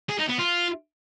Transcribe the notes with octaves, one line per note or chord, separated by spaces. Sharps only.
G#4
D#4
B3
F4